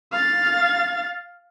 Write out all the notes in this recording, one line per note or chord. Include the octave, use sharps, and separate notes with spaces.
F5 A6